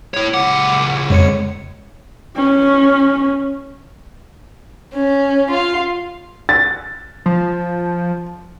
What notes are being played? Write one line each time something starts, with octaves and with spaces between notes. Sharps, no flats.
E4 C#5
C#2 F#5 D6
F2 G#3 C#5 C#7
C#4
C#4
F4 F5
A6
F3